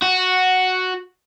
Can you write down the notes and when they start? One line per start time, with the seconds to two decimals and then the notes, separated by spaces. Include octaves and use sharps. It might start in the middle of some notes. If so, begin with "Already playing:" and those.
0.02 F#4